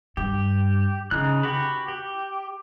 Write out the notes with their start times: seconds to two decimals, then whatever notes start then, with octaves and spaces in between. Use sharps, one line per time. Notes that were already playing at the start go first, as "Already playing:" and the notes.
0.17 G2 G4
1.11 C#3 D#4 E4 F#6
1.43 F#4 G4 B4
1.88 G4